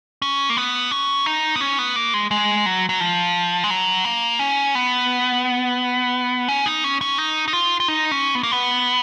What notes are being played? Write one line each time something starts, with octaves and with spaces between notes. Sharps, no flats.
C#4
A#3
B3
C#4
D#4
B3
C#4
B3
A#3
G#3
G#3
F#3
F#3
F3
G#3
F#3
A#3
C#4
B3
C#4
D#4
C#4
C#4
D#4
D#4
F4
F4
D#4
C#4
B3
A#3
B3